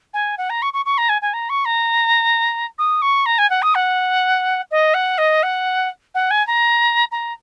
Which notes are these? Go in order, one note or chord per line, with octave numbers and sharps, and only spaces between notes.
G#5
F#5
A#5
C#6
C#6
C#6
A#5
G#5
G#5
A#5
C#6
A#5
D#6
C#6
A#5
G#5
F#5
D#6
F#5
D#5
F#5
D#5
F#5
F#5
G#5
A#5
A#5